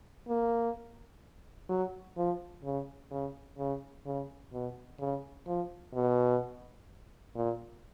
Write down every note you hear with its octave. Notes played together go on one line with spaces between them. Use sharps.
A#3
F#3
F3
C#3
C#3
C#3
C#3
B2
C#3
F3
B2
A#2